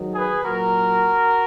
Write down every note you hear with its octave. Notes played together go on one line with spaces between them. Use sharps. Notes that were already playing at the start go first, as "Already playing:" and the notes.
Already playing: G#2 D#3 F#3
G#4 B4
A#2 F#3 F#4 A#4